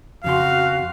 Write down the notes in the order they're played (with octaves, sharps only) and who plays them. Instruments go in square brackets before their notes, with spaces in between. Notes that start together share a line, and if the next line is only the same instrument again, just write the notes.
[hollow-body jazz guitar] F2 C#3 C6 [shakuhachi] F#4 [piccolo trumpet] F5